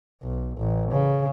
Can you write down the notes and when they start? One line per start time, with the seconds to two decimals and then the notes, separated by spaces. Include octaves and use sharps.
0.23 B1
0.58 A1
0.91 C#3